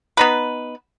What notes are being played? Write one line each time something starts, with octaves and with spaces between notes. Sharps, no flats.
B3 D#4 B4